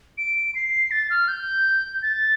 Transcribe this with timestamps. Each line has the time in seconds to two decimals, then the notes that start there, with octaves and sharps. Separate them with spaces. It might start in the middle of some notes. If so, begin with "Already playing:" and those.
0.18 D7
0.55 C7
0.91 A6
1.10 F6
1.28 G6
2.02 A6